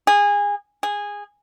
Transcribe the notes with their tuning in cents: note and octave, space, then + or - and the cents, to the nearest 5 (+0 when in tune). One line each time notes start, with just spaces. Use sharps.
G#4 -25
G#4 -15